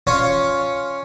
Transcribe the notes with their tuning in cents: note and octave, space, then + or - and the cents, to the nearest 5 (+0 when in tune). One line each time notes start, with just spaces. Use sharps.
C#4 +0 F4 +5 C#5 +0